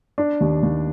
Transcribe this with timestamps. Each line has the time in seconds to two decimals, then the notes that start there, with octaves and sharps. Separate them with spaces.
0.18 D4
0.41 D#2
0.63 D#2